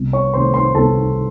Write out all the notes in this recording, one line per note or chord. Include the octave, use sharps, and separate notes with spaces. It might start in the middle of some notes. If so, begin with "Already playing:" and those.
Already playing: C2
C#5 C#6
C3 D#3 A3 C5 C6
C5 C6
C2 A4 A5